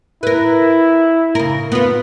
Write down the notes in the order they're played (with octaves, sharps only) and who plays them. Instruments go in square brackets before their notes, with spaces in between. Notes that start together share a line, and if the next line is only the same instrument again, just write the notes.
[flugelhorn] E4 [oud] A#4 B4
[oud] C#3 A#4
B3 F4